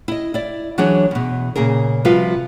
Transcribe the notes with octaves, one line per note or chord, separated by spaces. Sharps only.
E4 D#5
E4 D5
E3 F#3 D4 F#4 G#4 C#5
E2 B2
A#2 C#3 G#4 A#4
C3 F3 G3 F4 F#4 B4